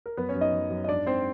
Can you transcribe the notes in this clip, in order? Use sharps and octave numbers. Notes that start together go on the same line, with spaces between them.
A#4
F#2 B3 B4
C#4 C#5
F#2
D#4 D#5
F#2
F#2
D#5
G#2 D4 D5
G#2 C4 C5